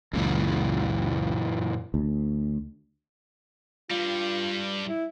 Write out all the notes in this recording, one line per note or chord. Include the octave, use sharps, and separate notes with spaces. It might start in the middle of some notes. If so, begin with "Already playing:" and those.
C#2 F#2 A#2 E3
D2
G2 G3 F4
E4